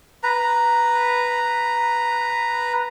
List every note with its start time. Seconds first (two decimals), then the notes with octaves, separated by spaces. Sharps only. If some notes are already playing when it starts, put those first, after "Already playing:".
0.23 B4 A#5